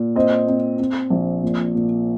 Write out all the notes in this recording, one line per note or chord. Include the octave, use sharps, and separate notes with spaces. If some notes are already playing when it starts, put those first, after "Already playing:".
Already playing: A#2
C4 C5 D#5
C4
C4
A#1
A#2
A#2